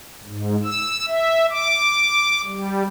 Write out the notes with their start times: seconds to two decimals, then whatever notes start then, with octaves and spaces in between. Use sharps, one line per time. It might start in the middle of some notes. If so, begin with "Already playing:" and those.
0.24 G#2
0.64 E6
1.08 E5
1.50 D6
2.45 G3